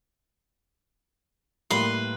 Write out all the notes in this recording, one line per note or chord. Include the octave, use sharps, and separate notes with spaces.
A2 G3 A#3 B4 C6